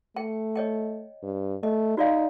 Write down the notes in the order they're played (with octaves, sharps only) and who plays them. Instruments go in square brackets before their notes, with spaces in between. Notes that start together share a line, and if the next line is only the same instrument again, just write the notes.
[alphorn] A3 [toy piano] G5
[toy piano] C#5 D#5 G5
[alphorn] G2
[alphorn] A3 [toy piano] D#5
[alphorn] D#4 [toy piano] F#4 D5 F5